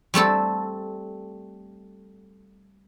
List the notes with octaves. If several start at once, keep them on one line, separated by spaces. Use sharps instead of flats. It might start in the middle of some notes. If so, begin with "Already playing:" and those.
G3 A3 C4 A4